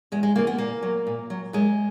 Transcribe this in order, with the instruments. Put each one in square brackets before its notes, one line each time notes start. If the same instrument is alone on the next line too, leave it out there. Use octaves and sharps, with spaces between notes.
[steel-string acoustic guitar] E2 G#3
G#3
C#3 E3 A#3
B3
A#2 A#3
F#3
A#2
F#3
F#2 G#3